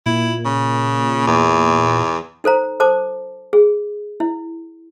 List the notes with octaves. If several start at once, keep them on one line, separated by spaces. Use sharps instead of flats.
A#2 E4
C#3
E2
D#4 A4 C5 A#5
A4 C5 A5 D6
G#4
E4